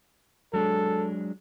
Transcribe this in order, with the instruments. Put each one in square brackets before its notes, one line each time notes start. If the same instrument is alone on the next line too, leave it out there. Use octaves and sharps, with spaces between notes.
[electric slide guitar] F#3 G#3 D4 [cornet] A4